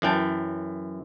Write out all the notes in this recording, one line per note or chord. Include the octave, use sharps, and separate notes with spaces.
F#2 E3 G5 A5